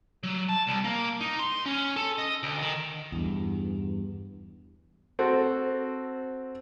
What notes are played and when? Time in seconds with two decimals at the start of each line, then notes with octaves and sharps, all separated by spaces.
0.23 F#3
0.49 A5
0.68 C2
0.84 A#3
1.21 D#4
1.39 C6
1.66 C#4
1.96 A4
2.18 D#5
2.43 D2
2.62 D#3
3.12 E2 G2
5.19 C4 F#4 A4